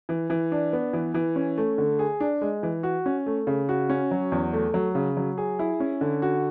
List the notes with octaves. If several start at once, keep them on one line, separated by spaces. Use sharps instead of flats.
E3
E3
D4
B3
E3
E3
C#4
A3
D3
G#4
D4
G#3
E3
F#4
C#4
A3
C#3
F#4
C#4
F#3
E2
A3
F#3
C#3
F#3
G#4
E4
C#4
D3
F#4